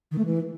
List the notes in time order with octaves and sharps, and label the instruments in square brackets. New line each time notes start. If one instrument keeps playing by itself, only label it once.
[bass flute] D#3
A3
E3